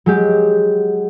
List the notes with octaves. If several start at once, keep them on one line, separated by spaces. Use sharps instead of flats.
F#3 G#3 G4